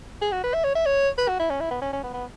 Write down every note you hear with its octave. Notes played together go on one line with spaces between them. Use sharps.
G#4
F#4
B4
E5
C#5
E5
C#5
B4
F#4
E4
C#4
E4
B3
C#4
C#4
B3
B3